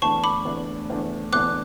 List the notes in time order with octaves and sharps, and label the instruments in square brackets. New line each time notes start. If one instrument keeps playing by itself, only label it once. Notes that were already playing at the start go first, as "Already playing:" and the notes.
[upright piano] E2 D3 A3 D4 [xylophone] A5 C#6
[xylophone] B5 D6
[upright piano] E2 D3 A3 D4
E2 D3 A3 D4
[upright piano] E2 D3 A3 D4 [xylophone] D6 F#6